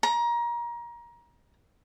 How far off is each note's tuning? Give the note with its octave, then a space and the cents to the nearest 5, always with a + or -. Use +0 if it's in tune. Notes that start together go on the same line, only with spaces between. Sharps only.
A#5 +25